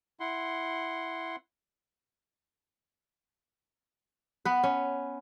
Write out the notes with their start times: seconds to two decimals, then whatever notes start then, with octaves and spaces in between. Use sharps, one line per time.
0.20 E4 F#5 C6
4.45 B3 B4
4.64 C#4